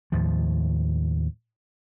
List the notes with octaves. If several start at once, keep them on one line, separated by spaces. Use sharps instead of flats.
D#2 A2 F3